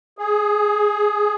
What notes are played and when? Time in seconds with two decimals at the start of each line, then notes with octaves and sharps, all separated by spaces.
0.18 G#4